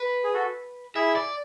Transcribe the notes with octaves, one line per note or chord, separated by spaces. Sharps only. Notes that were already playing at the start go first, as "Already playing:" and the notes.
Already playing: B4
G#4
F#4 A4
E4 G#4 E5
D5